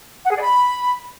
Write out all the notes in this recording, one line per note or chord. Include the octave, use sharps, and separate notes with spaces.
F#5
G#4
D5
B5